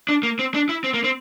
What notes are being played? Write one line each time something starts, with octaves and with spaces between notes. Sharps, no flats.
D4
A#3
C4
D4
E4
C4
A#3
C4